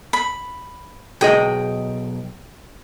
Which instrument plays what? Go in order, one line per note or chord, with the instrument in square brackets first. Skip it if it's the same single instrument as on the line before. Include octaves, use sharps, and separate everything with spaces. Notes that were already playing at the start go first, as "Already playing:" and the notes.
[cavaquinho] B5
[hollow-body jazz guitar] B1 G#4 D#5 [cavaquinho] G5